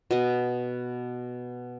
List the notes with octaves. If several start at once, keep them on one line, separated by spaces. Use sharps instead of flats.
B2 D#5